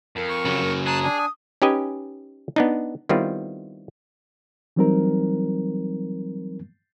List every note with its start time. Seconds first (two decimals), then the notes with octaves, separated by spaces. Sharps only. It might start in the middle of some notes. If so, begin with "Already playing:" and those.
0.16 F2 A#4
0.30 C#6
0.45 C#3 F#3
0.87 G#4 A5 A#5 F#6
1.03 D4 G#5
1.18 D#6
1.62 C#4 D#4 G4 B4 D#5 G#5
2.56 B3 D4 D#4
3.09 D#3 G3 B3 C4 E4 F4
4.76 E3 F#3 G3 C4 D#4 A#4